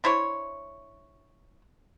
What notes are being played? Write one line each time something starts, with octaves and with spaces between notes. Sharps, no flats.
D4 E4 C5 C#5